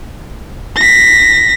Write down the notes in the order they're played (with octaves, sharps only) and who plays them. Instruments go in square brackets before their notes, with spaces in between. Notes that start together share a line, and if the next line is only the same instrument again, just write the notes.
[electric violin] A#6 B6